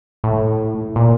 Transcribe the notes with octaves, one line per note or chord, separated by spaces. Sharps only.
A2
A#2